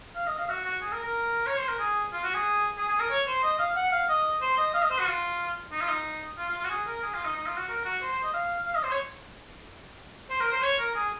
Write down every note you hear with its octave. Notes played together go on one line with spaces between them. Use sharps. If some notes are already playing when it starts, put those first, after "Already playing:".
F5
D#5
F5
F#4
F#4
G#4
A#4
A#4
C#5
C5
A#4
G#4
F4
F#4
G#4
G#4
G#4
A#4
C#5
C5
D#5
F5
F#5
F5
D#5
C5
D#5
F5
D#5
C5
F#4
F4
D#4
F4
D#4
F4
F4
F4
F#4
G#4
A#4
G#4
F4
D#4
D#4
F4
F#4
A#4
F#4
C5
C5
D#5
F5
F5
D#5
C5
C#5
C5
A#4
C5
C#5
A#4
G#4